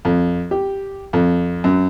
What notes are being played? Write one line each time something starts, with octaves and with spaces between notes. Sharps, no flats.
F2
G4
F2
F#2